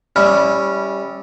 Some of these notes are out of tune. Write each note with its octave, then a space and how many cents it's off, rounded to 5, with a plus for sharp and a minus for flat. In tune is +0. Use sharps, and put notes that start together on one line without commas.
G3 +5 C#4 -5 E4 -25